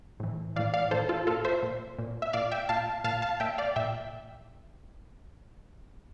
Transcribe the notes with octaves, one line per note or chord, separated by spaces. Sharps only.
A2 E3
A2 E3 D5 F5
D5 F5
A2 E3 A4 C5
F4 A4
A#2 F4 A4
C5 E5
A#2
A#2
E5
A#2 D5 F5
E5 G5
A#2 F5 A5
A#2 F5 A5
F5 A5
A#2 E5 G5
D5 F5
A#2 E5 G5